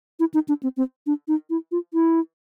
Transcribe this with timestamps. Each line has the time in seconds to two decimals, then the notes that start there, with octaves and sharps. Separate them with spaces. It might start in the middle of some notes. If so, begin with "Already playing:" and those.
0.20 E4
0.34 D#4
0.48 D4
0.63 C4
0.77 C4
1.06 D4
1.28 D#4
1.50 E4
1.72 F4
1.94 E4